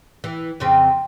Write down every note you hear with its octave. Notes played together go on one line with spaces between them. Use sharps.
E3
F2 C#3 C4